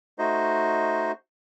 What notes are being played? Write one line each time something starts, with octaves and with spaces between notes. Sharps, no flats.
A3 D#4 F#4 C5 D#5